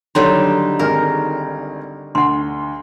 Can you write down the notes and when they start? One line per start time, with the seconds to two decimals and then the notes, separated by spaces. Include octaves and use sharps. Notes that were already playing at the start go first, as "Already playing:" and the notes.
0.15 D3 D#3 F#3 G3 D#4 C#5 C6
0.79 G#1 G#4 A#4 F6
2.15 D2 F#5 C6